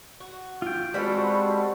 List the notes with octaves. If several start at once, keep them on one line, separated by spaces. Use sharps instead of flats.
F#4
F4 G5
G3 G#3 B3 C4 F#4 A4